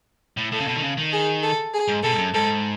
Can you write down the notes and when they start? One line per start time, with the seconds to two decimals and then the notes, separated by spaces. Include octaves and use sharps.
0.37 A2
0.52 A2 A4
0.60 C#3
0.67 B2
0.76 D#3
0.82 C#3
0.98 D#3
1.12 G#4
1.42 A4
1.73 G#4
1.88 G#2
2.03 B2 A4
2.11 G#2
2.18 F#2
2.34 G#2 A4